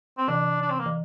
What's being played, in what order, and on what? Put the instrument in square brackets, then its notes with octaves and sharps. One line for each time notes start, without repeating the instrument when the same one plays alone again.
[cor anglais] C4
[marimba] C3 E3 [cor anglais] D4
[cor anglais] D4
C4
A#3
[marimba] E3